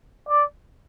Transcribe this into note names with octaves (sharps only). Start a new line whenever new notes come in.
D5